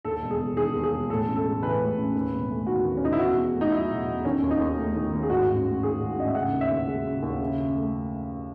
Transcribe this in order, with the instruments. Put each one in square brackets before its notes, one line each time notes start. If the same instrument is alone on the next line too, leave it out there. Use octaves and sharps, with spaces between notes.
[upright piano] D#2 A4
E1
G#4
E1
D#3 G#4
D#2
G#4
E1
A2 A4
A1
A4
G#3
E3 B4
A2
A1
D#2
E1
A3
D#3 F#4
D#2
C#4
E1 D#4
E4
B2 F#4
E2
A3
D#4
F#3 E4
B2
E2
D#3 C#4
D#2
D#4
D#2
A3
D#3
D#2
G#4
G#2 F#4
A1
A1
D#3 G#4
G#2
A1 D#5
E5
C#3 F#5
D#2
E5
D#2
G#3
C#3
D#2
C#3
F#2
A3